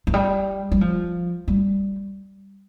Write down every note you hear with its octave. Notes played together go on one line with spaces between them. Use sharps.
F3
G3
G3
F3
G3